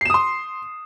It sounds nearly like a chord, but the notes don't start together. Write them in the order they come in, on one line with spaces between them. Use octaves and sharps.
C7 E7 D#6 C6